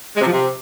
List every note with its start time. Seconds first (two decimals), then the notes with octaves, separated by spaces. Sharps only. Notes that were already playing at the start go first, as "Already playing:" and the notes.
0.16 G#3
0.21 C3
0.26 F3
0.32 C3